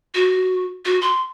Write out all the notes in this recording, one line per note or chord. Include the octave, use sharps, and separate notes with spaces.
F#4
F#4
C6